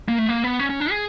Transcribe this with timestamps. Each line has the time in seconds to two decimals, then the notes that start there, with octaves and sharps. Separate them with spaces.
0.08 A#3
0.18 A3
0.29 A#3
0.44 B3
0.59 C#4
0.70 C#4
0.80 D4
0.91 G#4